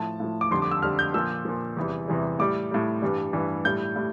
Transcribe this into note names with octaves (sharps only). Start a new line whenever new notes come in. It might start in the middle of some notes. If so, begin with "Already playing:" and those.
Already playing: A2 F3 A5
A2 F3
D6
F2 D3 G3 C6
D6
E6
F2 D3 G3 F6
G6
A#2 F3 E6
A#2 F3
E2 C3 E3 G3
E2 C3 E3 G3
A2 G3 D6
A2 G3
G2 E3 G3
G2 E3 G3
A2 G3 G6
A2 G3